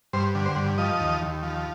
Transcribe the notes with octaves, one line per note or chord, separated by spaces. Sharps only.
G2 C5
D3
C5
G2
F3 D#5
D#2
D#2
F3